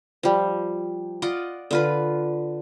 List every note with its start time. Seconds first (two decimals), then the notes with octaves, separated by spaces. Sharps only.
0.23 F3 G3
1.22 F4 D5 D#5 F#5
1.71 D3 F4 B4